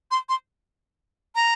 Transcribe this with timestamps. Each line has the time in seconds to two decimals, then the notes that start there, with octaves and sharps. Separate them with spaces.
0.11 C6
0.29 C6
1.35 A#5